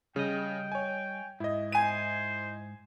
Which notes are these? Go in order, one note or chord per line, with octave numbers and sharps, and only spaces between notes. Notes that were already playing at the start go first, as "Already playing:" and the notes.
C#3 G3 D#5 G5
C#5 G#5
G#2 E4 D#5
C5 G#5 D#7